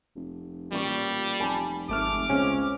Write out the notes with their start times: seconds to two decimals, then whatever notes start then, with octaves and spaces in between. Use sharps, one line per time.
0.15 F1
0.72 A1 A#2 G3 C#6
1.40 F1 G#5 A5 B5
1.89 G#1 A3 D6 F6
2.29 C#2 C#3 C4 C#4 F6